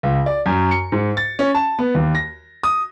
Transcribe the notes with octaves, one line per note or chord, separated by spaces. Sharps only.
C#2
D5
F#2
C#7
G#2
A6
C#4
A5
B3
D#2
A#6
D#6